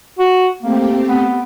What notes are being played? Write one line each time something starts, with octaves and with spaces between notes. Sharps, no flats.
F#4
A3 A#3 C4 G4
B3